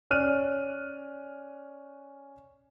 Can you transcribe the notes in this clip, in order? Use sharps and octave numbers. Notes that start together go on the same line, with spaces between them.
C#4 D5 F6 F#6 D#7